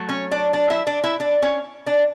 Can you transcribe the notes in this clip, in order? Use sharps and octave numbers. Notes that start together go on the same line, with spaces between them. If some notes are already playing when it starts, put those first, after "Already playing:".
Already playing: F#3 A3
C#4 C#5
D4 D5
D4 D5
E4 E5
D4 D5
E4 E5
D4 D5
C#4 C#5
D4 D5